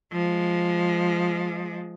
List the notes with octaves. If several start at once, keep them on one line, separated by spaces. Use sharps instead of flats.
F3 G#3